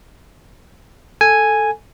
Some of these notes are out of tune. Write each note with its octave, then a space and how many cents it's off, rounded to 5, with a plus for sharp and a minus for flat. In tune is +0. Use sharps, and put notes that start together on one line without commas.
A4 +0 G#5 +0